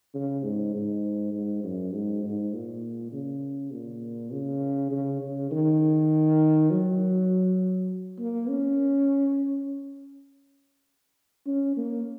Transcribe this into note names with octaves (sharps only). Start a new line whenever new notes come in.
C#3
G#2
G#2
G#2
F#2
G#2
G#2
A#2
C#3
A#2
C#3
C#3
C#3
D#3
F#3
A#3
C#4
C#4
A#3